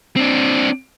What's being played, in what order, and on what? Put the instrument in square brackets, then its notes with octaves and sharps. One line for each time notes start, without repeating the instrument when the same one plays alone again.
[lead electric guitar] C4 D4